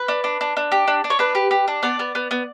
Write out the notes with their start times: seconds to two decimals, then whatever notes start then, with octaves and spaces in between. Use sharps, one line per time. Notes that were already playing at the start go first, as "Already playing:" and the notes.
Already playing: B4
0.08 D4
0.24 D4
0.41 D4
0.57 D4
0.72 G4
0.88 D4
1.04 D4
1.10 C#5
1.19 D4 B4
1.35 G4
1.51 G4
1.68 D4
1.83 B3 D5
1.99 B3
2.15 B3
2.31 B3